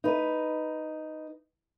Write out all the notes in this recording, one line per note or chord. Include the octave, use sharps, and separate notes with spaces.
D#4 B4